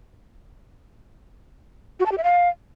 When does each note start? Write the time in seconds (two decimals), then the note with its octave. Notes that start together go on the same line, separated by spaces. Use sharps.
2.00 F#4
2.06 A5
2.12 G4
2.18 E5
2.24 F5